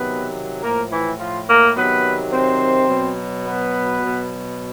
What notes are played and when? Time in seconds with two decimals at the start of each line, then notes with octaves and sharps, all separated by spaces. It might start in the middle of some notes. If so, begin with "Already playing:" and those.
Already playing: C3 D#3 F#3 B3 B4
0.63 A2 F3 A#3 A#4
0.91 E3 E4
1.20 F3 F4
1.48 A#3 A#4
1.76 C3 D#3 F#3 B3 B4
2.32 C4 C5
2.89 B2 F#3
3.45 B3 B4
4.01 B2 F#3